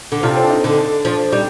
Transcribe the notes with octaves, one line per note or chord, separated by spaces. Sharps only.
D3
C3 D4 F4
C4
D4
C4 D#4
D3
D4
F3 D4
G3 C4 D#4